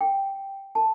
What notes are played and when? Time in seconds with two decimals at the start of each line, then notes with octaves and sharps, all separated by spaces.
0.01 G5
0.75 A5